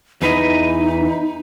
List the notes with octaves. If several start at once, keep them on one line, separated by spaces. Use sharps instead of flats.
E2 E3 D#4 B4 D#5